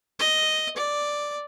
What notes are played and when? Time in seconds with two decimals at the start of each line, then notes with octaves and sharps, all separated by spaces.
0.19 D#5
0.76 D5